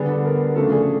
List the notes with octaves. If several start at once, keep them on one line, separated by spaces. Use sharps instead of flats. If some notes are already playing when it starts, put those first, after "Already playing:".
Already playing: D3 G3 B3 D4 G#4
A4
A#4
C#3 F3 A3 D4 A4
G#4